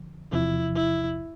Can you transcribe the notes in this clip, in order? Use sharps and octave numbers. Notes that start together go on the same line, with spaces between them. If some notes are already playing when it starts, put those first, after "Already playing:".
Already playing: D3 F3
E2 C3 F3 E4
E4